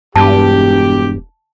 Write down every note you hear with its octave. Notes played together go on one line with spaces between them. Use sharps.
E1 G2 G4 A5